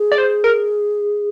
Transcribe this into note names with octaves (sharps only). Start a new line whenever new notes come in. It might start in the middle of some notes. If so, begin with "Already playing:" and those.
Already playing: G#4
D5
C5
A#4